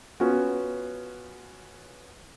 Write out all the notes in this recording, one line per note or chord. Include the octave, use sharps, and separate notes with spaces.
B3 C#4 F4 F#4